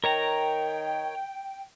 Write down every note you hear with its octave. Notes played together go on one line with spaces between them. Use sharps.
D#3 A#4 C#5 G5 A#5